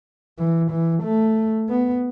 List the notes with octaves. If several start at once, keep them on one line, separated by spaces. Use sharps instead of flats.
E3
E3
A3
B3